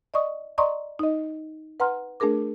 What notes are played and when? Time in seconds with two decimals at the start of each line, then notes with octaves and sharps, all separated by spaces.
0.14 D5 D#5 C#6 D#6
0.58 D5 D#5 A#5 C6 C#6 D#6
0.99 D#4 D#5
1.80 B4 F#5 A#5 C6 F6
2.20 A3 D4 G#4 A#4 D6